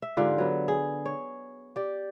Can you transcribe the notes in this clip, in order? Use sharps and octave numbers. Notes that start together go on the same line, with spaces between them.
E5
G#2 D3 F4 G4
F#3 B3
G#4
C#5
G4 D5